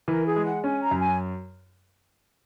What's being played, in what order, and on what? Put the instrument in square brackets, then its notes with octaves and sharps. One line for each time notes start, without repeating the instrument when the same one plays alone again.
[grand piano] E3 [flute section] A#4
[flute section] G#4
[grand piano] G#3
[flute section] F#5
[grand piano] C#4 [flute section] G#5
[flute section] A#5
[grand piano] F#2
[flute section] G#5